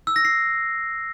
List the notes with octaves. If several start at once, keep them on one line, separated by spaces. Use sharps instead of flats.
E6
A#6
C7